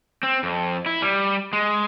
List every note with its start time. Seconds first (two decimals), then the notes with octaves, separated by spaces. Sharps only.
0.23 C4
0.43 F2
0.86 E4
1.02 G3
1.53 G#3